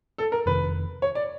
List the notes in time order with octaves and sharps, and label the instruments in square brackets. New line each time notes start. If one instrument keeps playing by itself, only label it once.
[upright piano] A4
A#4
[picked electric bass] F1 F2 C3 D#3 [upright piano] B4
[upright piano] C#5
D5